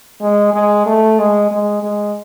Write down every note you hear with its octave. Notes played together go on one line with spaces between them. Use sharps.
G#3
G#3
A3
G#3
G#3
G#3